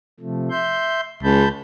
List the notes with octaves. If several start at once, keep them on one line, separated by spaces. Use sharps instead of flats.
C3 F3 A3
E5 C6 G6
C#2 A5 B5 G6